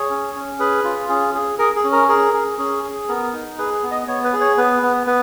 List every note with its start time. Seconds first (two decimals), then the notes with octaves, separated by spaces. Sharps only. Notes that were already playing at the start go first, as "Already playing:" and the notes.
Already playing: G#4 C#5
0.10 C#4
0.35 C#4
0.59 G#4 B4
0.84 F4
1.09 C#4 G#4
1.34 G#4
1.59 G#4 A#4
1.76 G#4
1.84 C#4
1.92 A#4
2.08 G#4 A#4
2.34 G#4
2.58 C#4 G#4
2.83 G#4
3.08 B3 A#4
3.33 D#4
3.58 G#4 B4
3.83 B3
3.91 D#5
4.08 B3 C#5
4.24 B4
4.33 G#4
4.41 C#5
4.57 B3 B4
4.83 B3
5.07 B3 B4